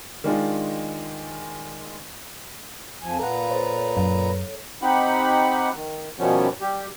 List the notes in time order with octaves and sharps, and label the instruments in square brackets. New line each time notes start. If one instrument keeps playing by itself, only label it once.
[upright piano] D#3 G#3 D4 F4
[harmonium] F2 F3 G#5
[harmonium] A#2 B4 A#5 [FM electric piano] A4 F#5 [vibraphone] F5
[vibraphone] A4 C#5 [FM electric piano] C5
[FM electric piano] F#2
[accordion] C4 D#4 G4 F#5 B5
D#3
B2 D#3 F3 G3 B3 C#4
G3 G4